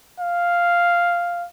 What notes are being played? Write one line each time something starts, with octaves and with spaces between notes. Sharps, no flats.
F5